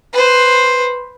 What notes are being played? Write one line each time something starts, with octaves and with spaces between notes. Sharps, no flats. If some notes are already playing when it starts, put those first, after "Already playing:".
B4 C5